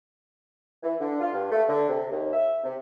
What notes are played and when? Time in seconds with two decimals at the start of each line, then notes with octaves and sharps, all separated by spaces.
0.83 E3
1.00 D3
1.21 F4
1.34 G2
1.51 A3
1.69 D3
1.89 C3
2.11 D#2
2.33 E5
2.63 C3